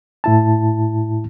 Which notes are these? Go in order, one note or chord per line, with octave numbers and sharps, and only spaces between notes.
A2 E4 A5